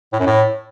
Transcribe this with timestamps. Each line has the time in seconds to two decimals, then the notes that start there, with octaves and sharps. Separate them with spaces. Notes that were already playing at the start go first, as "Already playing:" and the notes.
0.13 A2
0.20 F#2
0.27 A2